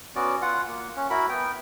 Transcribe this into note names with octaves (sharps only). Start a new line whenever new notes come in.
B3 C#4 F#4 D5
F4 F#5
A#3
C#4
E4 F#4 A#4 B5
B3 G5